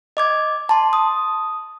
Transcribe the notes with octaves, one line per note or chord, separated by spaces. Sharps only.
D#5 D6 G#6
A5 C6
D#6